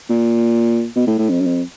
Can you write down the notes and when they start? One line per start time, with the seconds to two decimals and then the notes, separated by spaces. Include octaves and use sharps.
0.10 A#2
0.96 B2
1.07 A2
1.18 A2
1.29 F2
1.41 F#2
1.46 F2